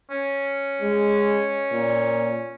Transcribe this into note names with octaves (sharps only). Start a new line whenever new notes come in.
C#4
G#3
A#2